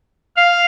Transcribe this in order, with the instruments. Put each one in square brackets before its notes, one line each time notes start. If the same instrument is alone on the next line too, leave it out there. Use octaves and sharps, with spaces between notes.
[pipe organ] F5